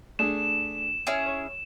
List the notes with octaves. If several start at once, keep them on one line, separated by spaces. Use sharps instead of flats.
A3 D4 G#4 E7
C#4 E4 G#4
C#5